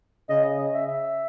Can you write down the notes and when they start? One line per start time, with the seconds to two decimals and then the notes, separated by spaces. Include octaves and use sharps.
0.29 C#3 D#5
0.44 D#5
0.58 D#5
0.73 E5
0.87 E5